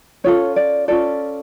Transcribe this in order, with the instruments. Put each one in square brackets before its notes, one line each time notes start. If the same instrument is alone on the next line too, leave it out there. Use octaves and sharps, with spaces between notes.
[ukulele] C#4 F4 A4 C#5
D5
C#4 F4 A4 D5